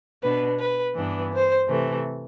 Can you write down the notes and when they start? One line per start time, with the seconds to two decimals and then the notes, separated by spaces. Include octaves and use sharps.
0.23 B2 B3 D4 B4
0.59 B4
0.96 G2 E3 B3 D4
1.33 C5
1.69 C3 E3 A3